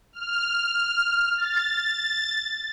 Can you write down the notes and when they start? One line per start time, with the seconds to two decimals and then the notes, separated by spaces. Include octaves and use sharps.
0.13 F6
1.38 A6